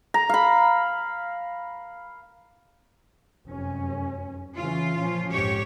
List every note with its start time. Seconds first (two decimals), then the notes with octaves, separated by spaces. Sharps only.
0.14 A#5
0.29 F5 B5
3.46 F1 F#2 C#4
4.57 C#3 E3 C#4 F4
4.98 A#2 F3 C#4
5.32 A#1 F2 G#2 G4 C#5